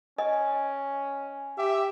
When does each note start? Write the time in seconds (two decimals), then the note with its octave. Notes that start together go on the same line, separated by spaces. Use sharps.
0.18 C#4 D#5 G#5
1.58 G4 E5